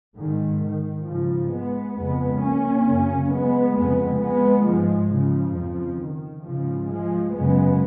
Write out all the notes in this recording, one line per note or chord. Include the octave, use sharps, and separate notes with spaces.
G#2 D#3
D#3
G#2 C#3 F3
G#3 B3
F2 C#3 G#3 B3
A#3 C#4
F#2 C#3
G#3 B3
F2 C#3 G#3 B3
G#3 B3
G#2 F3 G#3
C#3 F3
F2 C#3
D#3
G#2 C#3 F3
F3 G#3
F#2 C#3 G#3 B3